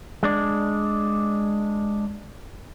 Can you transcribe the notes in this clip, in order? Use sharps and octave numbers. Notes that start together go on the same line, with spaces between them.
G#3 D4 D5